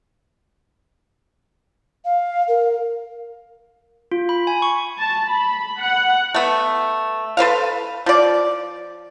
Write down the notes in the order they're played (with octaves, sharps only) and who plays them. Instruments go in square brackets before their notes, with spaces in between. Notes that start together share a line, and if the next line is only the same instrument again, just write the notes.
[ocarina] F5
A#4
[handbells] F4
B5
G#5
C#6
[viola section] A5
B5
F#5
[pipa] A3 B3
A4 B4 C5 F5
F3 D5